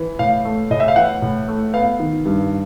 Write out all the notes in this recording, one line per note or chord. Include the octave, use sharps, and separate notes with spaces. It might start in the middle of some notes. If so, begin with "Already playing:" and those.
Already playing: E3
A2 F5
A3
A2 D#5
E5
F5
E3 F#5
A2
A3
B3 F5
D#3
G2